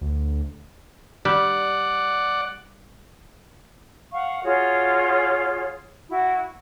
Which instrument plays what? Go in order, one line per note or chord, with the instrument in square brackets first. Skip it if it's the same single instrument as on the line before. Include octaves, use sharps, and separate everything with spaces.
[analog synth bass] D2
[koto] G3 [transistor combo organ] D5 F#5
[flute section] F5 F#5 C#6
F4 F#4 G#4 C#5
E4 F#4